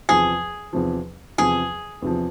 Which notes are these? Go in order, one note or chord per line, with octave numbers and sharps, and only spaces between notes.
E2 C3 F3 G#4
E2 C3 F3
E2 C3 F3 G#4
E2 C3 F3